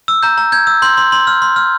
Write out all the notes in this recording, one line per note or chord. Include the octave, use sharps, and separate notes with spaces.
E6
A#5 G6
A#5
G6 G#6
E6
C6 G6
C6
C6
F6
C6
F6